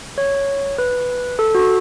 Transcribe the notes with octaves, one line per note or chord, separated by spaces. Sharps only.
C#5
B4
A4
F#4